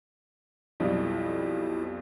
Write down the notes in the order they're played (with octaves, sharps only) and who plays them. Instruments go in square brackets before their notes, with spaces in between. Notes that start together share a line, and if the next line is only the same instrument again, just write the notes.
[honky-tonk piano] B1 F2 G3 [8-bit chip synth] E4 G4 C5